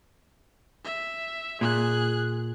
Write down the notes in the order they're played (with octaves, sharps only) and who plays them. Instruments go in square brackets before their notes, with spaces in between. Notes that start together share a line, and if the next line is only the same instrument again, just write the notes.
[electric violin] E5
[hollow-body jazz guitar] A#2 [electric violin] G#4 F#6